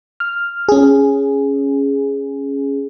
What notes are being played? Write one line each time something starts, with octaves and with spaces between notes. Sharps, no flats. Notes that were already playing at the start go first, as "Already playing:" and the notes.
F6
C#4 G#4